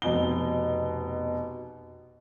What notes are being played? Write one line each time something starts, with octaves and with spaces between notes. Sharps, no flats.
F1 B2 G7